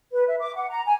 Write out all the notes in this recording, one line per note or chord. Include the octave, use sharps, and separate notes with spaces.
B4
E5
D6
F#5
A#5
G#5